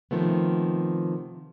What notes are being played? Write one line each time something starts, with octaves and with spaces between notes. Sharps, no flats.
C3 D#3 F3 A3 B3